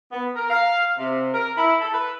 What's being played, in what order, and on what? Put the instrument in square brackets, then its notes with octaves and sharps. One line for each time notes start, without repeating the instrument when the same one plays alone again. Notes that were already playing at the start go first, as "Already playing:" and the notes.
[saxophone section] B3
A#4
F5
C3
A#4
E4
A4
B4